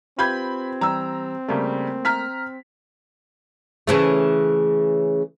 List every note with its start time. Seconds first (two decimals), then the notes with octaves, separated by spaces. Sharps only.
0.19 C4 F4 G4 B4 B5 G6 G#6
0.81 E3 G3 G4 A#5 E6
1.48 C#3 G3 A3 A#3 A#4
2.05 A#5 F6 B6
3.87 C#3 E3 A3